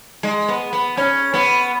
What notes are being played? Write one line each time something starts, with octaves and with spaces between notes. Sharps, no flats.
G#3
B3
B3
C#4
B3